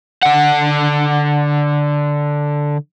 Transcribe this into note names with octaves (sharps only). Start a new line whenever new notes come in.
D3 F#5